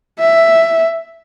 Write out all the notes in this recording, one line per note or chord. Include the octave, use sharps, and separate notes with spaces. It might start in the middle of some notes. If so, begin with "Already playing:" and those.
E5